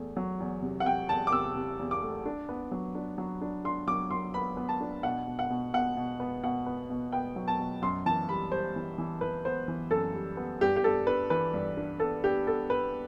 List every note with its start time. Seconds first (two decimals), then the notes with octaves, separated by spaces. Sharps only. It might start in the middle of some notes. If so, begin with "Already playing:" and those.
Already playing: E2 A3
0.17 F#3
0.40 E2
0.62 C3
0.80 F#5
0.86 C3 G5
1.09 E2 A5
1.27 D6
1.32 C3 E6
1.56 C3
1.79 E2
1.91 D6
2.02 A3
2.26 D4
2.49 B3
2.71 F#3
2.95 D4
3.18 F#3
3.41 D4
3.65 D4 C6
3.88 F#3 D6
4.11 F#3 C6
4.34 B3 B5
4.57 B3
4.69 A5
4.81 D4
5.03 B2 F#5
5.27 B2
5.39 F#5
5.50 B2
5.73 B2 F#5
5.97 B2
6.20 B3
6.43 B2 F#5
6.66 B3
6.90 B2
7.12 B3 G5
7.36 F#3
7.48 A5
7.59 B2
7.82 F#2 C6
8.06 E3 A5
8.29 G3 B5
8.52 G3 C5
8.76 E3
8.98 E3
9.21 E3 B4
9.45 B3 C5
9.68 E3
9.91 F#2 A4
10.14 G3
10.37 B3
10.61 G2 G4
10.76 G4
10.84 G2 A4
11.07 D4 B4
11.30 E3 B4
11.54 G2
11.77 D4
12.00 B3 A4
12.24 D4 G4
12.47 B3 A4
12.70 B3 B4